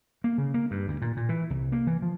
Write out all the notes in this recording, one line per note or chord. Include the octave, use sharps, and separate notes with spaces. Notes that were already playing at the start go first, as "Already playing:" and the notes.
A#3
C#3
A#3
G2
D2
A#2
A#2
E3
C2
A#3
E3
F3